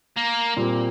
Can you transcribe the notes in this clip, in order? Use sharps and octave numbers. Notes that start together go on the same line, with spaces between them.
A#3
A#2 G3 C4 G4